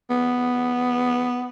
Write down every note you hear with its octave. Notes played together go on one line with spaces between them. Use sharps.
B3